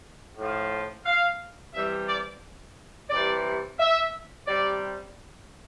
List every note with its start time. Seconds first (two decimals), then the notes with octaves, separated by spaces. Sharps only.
0.37 A2 F3
1.05 F5
1.73 C3 E3 G3 E5
2.07 D5
3.10 C3 E3 G3 D5
3.79 E5
4.47 C3 G3 D5